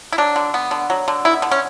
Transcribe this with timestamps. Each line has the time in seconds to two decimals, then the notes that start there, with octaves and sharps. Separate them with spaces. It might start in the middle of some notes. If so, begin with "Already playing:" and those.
0.13 E4
0.18 F#3 D4
0.36 D3
0.54 B3
0.71 D3
0.90 F#3
1.08 D3
1.25 B3 E4
1.42 D3
1.51 C#4